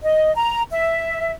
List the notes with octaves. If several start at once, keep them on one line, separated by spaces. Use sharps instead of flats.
D#5
A#5
E5